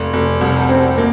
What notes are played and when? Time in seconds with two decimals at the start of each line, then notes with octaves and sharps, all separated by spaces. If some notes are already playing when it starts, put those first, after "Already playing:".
Already playing: F1
0.13 F1
0.41 C2
0.69 C4
0.98 A#3